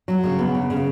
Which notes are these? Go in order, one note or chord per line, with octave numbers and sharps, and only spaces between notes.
F#3
C#3
B3
C#3
C#3